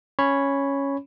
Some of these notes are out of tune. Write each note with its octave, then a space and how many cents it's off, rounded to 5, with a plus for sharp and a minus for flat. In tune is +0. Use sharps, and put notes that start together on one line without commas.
C#4 +0 C#5 +0 B5 +0